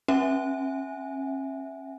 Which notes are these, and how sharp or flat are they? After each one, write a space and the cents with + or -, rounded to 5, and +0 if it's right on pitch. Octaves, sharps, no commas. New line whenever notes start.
C#4 -40 E5 +0 G#5 +0